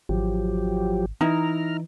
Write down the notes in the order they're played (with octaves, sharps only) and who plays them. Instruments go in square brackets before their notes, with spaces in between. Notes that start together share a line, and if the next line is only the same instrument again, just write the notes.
[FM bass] G#1 [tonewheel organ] F3 F#3 G4
[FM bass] E3 [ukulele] D#4 E4 [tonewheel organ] A#5 F6